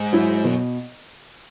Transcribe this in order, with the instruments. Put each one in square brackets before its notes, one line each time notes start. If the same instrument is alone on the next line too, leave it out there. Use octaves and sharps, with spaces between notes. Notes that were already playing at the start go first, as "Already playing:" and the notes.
Already playing: [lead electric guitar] G#2
[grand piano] F#3 E4
[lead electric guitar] F#2 [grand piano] B2